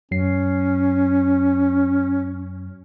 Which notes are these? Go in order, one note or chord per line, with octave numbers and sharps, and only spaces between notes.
F#2 F#3 C#4 C7